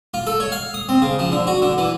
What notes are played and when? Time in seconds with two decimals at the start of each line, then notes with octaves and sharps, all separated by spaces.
0.14 F4
0.27 A4
0.40 C#5
0.52 F5
0.74 D#6
0.89 C4
1.02 C#3
1.19 F3
1.32 D3
1.47 F#4
1.62 D3
1.78 E3